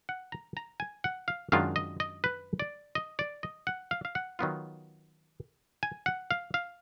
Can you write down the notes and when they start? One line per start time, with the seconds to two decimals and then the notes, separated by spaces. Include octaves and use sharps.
0.09 F#5
0.32 A#5
0.57 A#5
0.80 G#5
1.04 F#5
1.28 F5
1.52 F#2 D#3 G#3 D4 F4 F5
1.76 D#5
2.00 D#5
2.24 B4
2.60 D5
2.95 D#5
3.19 D5
3.43 D#5
3.67 F#5
3.91 F5
4.05 F5
4.15 F#5
4.39 D#3 F#3 B3 F4
5.83 G#5
6.06 F#5
6.31 F5
6.54 F5